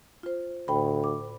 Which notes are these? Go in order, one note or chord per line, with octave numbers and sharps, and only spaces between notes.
F4 C5
D2 A2 G5 B5
D6